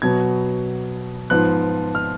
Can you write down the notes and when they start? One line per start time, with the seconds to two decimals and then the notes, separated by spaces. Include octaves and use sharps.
0.02 B2 F#3 B3 G#6
1.30 G#2 F3 B3 F#6
1.95 F6